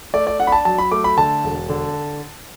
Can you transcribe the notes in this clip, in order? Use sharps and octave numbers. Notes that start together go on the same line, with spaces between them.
A3 D5
D5
D4 F#5
B5
A5
F#3 A5
B5
A3 D6
B5
D3 A5
E1
D3